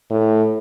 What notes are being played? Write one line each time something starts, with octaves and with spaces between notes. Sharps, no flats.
A2